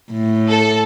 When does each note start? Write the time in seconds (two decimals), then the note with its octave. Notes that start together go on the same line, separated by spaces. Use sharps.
0.12 A2
0.49 A4